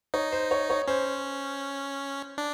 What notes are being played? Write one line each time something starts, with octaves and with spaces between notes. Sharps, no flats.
D#4 C#5
C5
C#5
C#5
C#4 C5
D4